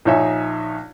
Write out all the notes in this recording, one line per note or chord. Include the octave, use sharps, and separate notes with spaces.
A#1 D#4 C#5 E5 G#5